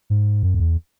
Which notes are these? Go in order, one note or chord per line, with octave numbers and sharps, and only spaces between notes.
G#2
F#2
F2
E2